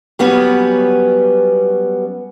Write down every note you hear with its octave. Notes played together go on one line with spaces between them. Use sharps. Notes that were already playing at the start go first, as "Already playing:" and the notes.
F#3 G3 B3 C#4 C#5